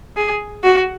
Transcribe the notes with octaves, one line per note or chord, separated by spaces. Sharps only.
G#4
F#4